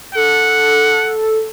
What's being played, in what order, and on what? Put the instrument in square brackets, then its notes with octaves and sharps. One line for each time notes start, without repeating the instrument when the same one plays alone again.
[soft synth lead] A4 [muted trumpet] F#5